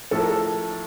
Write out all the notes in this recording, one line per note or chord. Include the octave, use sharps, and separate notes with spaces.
A2 F3 A4
A#4
A4